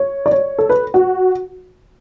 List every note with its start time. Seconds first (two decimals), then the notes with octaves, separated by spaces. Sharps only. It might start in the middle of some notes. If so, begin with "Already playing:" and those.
Already playing: C#5
0.26 D5
0.31 C#5
0.59 A4
0.69 B4
0.94 F#4